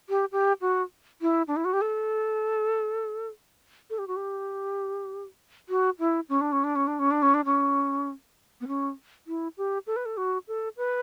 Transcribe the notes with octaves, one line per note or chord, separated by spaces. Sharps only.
G4
G4
F#4
E4
D4
E4
F#4
G4
A4
A4
G4
F#4
G4
F#4
E4
C#4
D4
C#4
D4
C#4
D4
C#4
D4
C#4
D4
C#4
B3
C#4
E4
G4
A4
B4
A4
F#4
A4
B4